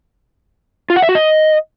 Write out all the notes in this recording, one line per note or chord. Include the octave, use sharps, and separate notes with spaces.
F4
F#5
E5
F#4
D#5